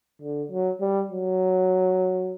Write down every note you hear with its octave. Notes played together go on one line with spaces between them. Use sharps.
D3
F#3
G3
F#3